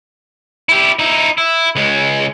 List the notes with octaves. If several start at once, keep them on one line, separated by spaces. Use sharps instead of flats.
E4 G4
D#4 E4
E4
C#2 G#3